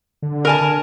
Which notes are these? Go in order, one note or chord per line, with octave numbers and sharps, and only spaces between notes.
D3
A#4 G#5 A5
D3